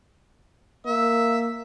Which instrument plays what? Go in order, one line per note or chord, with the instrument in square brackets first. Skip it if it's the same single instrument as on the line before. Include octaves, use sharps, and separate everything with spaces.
[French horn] A#3 [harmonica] E5